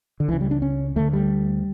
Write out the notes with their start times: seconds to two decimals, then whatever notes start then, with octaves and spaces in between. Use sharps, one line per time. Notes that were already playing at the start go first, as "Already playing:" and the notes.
0.20 D3
0.28 C#2 E3
0.33 C#3
0.41 G3
0.51 D4
0.62 C#4
0.96 D2 D3 A3
1.13 G3